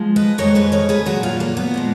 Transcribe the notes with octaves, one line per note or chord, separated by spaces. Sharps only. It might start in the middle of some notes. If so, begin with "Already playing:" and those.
Already playing: F3 G#3
B4 D#5
F2 D#3 G#3 A#4 C#5
G#4 B4
A#4 C#5
G#4 B4
A#2 F#3 F#4 A#4
F4 G#4
A#3
B3
A#2 F3 G#3